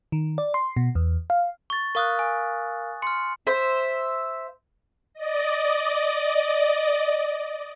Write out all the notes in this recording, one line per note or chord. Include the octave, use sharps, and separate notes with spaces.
D#3
D5
C6
B2
E2
F5
C#6 A6
A#4 F5 C#6 D#6 F6 F#6
G#5
C6 F6 C#7
C5 E5
D5 D#5